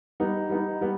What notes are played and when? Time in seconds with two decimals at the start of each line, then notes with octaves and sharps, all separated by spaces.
0.20 G3 B3 D#4
0.49 G3 B3 D#4
0.81 G3 B3